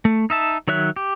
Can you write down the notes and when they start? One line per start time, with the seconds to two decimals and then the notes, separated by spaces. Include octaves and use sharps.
0.05 A3
0.30 D#4 E5 A5
0.68 D#3 F#3 C#5 E5 F#6
0.96 G4